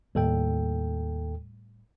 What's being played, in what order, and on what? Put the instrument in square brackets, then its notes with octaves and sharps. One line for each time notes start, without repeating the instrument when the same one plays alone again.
[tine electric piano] D#2 A4 G5 [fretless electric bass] A2 G3